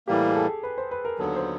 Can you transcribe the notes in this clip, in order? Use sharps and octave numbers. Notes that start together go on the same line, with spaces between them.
A2 E3 G3 A#3 G4
G#4
A4
B4
C5
B4
A#4
D#2 D3 F#3 B3 A4
C5